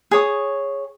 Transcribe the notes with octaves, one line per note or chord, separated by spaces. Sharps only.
G#4 C#5 D#6